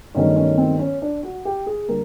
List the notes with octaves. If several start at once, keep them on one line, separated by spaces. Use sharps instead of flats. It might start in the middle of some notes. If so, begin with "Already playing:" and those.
G1 G2 D#3 F#3 A3 C#4
C#4
C4
C#4
D4
F#4
G4
G#4
D3 G3 A#3 A#4